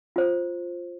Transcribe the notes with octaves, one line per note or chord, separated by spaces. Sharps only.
F4 C5